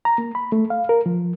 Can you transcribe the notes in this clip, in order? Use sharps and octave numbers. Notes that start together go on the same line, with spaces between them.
A#5
A#3
B5
A3
F5
A#4
F3